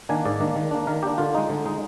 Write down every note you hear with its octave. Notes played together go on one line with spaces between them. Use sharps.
D#3 A#3 D4 G#5
G#2 D5
D#3 A#3 D4
D#3
A#3 D4
D#3 A#4
A#3 D4 G4
D3 F4
G#3 D#4
D3
G#3 D#4